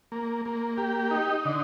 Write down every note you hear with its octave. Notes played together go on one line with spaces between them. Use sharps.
A#3
A#3
G4
D#4
D3